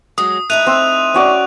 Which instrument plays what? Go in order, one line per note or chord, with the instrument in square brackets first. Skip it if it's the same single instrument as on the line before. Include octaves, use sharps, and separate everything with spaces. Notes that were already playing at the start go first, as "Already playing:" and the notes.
[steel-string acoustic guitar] F#3 G#3 [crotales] D#6
[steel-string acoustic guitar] A3 D#4 E4 [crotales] F#6 D#7 F7
[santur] C4 E6
C#4 F#4 D5